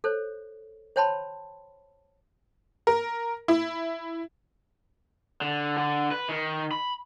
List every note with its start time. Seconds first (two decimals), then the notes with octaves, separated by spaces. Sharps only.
0.04 A4 C5 C#5
0.96 C5 C#5 G5 A5 B5 C6
2.87 A#4
3.48 E4
5.41 D3
5.78 D3
6.11 B4
6.29 D#3
6.72 B5